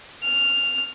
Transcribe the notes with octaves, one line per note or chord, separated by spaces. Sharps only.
F6